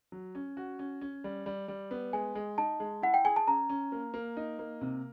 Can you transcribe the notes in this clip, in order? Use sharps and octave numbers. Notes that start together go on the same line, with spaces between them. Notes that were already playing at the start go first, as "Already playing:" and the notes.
F#3
C#4
F#4
C#4
C#4
G3
G3
G3
B3
G#3 G#5
G#3
D#4 A5
G#3
E4 F#5
G5
G#4 G#5
A5
C#4 A#5
C#4
A#3
A#3
D#4
A#3
C3